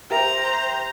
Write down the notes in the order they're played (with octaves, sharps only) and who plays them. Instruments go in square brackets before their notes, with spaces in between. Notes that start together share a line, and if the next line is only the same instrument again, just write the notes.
[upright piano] G4 A#4 E5 [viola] C5 A#5